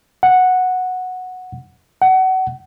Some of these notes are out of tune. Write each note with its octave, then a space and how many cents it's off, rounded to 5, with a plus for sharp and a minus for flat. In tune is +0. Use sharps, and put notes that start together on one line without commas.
F#5 -5
F#5 +30